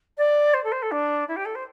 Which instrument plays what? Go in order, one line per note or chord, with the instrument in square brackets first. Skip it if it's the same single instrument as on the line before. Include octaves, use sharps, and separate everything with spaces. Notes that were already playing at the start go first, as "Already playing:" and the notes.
[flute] D5
C5
A4
C5
A4
D4
E4
G4
A4
C5